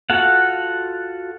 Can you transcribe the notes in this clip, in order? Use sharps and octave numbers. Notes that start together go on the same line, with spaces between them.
F4 F#4 A4 F5 F#5